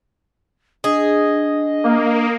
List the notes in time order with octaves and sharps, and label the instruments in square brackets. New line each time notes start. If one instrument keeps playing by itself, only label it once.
[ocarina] D4 [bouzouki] G#4 [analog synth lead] D#5
[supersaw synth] A#3